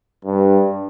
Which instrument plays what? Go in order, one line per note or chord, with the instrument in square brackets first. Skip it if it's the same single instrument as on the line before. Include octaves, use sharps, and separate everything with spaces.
[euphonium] G2